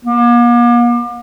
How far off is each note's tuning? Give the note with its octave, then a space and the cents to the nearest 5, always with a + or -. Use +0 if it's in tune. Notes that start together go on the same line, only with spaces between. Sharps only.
A#3 +45